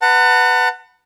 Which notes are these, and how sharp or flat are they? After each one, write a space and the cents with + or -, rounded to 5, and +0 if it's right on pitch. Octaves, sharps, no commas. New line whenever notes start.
B4 +0 F#5 +5 A5 +40